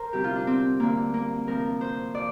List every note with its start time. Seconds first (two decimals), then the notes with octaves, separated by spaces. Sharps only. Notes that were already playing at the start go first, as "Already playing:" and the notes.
Already playing: A#4 C5
0.13 D2 C3 G3 G4
0.24 F4
0.35 D4
0.47 C4
0.80 G2 D3 G3 A#3
1.14 A#3
1.47 D2 C3 F3 A#4
1.81 C5
2.15 F3 D5